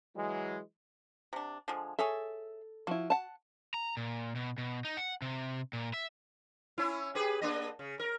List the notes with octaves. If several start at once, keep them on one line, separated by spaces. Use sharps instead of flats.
E3 F#3 G#3
C3 D4
D3 F3 G#3
G#4 A4 C#5 E5
F3 E4 F#4
F#5 A5
A#5
A#2
B2
B2
D#4
F#5
C3
A#2
E5
C#4 E4
G4 G#4 B4
A#3 D4 D#5
C#3
A#4